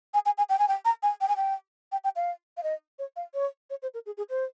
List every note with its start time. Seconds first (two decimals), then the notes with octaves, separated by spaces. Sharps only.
0.14 G#5
0.26 G#5
0.38 G#5
0.49 G5
0.59 G#5
0.68 G5
0.85 A#5
1.03 G#5
1.21 G5
1.28 G#5
1.36 G5
1.92 G5
2.04 G5
2.16 F5
2.57 F5
2.63 D#5
2.99 C#5
3.16 F5
3.34 C#5
3.70 C#5
3.82 C5
3.94 A#4
4.06 G#4
4.17 G#4
4.30 C5